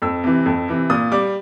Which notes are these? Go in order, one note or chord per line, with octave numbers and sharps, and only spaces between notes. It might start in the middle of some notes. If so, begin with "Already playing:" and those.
F2 E6
C3 E3
F2
C3 E3
A#2 D#6
G3 D6